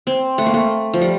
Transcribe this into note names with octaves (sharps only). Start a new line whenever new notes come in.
C4
A3
A#3
A3
F3
G3